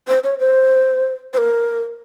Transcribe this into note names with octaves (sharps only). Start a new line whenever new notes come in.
C5
C#5
C5
C5
A#4